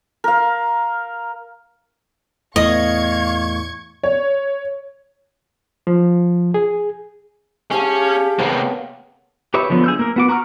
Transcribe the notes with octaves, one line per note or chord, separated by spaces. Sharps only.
A#4 F5
E2 A2 D#5 F5 C#6 G#6
C#5
F3
G#4
C#4 G4 G#4 F5 A5
C3 A#3 B3 C#5 G5
G4 B4 C#5 E5 D#6
D3 F3 F#3 B3
G#4 E6 G6
A#3 A#4
B3 F#4 D6
F#4 A#5 C#6 D#6 F6